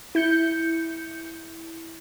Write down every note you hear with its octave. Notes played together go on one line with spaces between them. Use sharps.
E4 G6 C#7